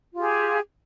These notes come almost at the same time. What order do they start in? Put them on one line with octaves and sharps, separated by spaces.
F4 G4 G#4